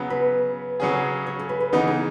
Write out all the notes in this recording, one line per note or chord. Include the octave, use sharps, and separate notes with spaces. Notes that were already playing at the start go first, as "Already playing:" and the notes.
Already playing: C#3 F#3 B3
B4
C#3 F#3 C#4 G#4
C#5
A4
B4
B4
C#3 E3 B3 D#4 A4
G#4